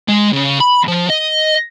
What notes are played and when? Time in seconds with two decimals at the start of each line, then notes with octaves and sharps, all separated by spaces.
0.08 G#3
0.33 C#3
0.60 B5
0.88 F3
1.10 D#5